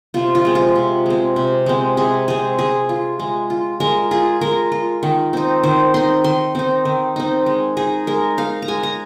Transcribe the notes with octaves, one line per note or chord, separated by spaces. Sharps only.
C3 F4
F4
G#3 C4
F4
C3
G#3 C4
C3
G#3 C4
C3 G#4
G#3 C4 G#4
G#3 G#4
F4
G#3
F4
G#3 A#4
F4 G#4
G#3 A#4
F4
D#3
C4 D#4
D#3 C5
C4 D#4 C6
D#3 C6
C4 D#4
D#3
C4 D#4
G#3
D#4 G#4
G#3 A#4
D#4 F5
A#5
G#3 G#5
A#5